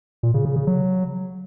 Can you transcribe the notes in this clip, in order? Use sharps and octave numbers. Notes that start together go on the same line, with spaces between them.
A#2
C#3
C#3
C#3
F#3